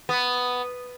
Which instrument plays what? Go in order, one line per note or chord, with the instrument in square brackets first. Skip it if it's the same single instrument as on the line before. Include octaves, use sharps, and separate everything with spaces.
[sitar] B3